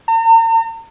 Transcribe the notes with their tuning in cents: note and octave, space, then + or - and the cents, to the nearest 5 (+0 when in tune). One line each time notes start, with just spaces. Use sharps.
A#5 -45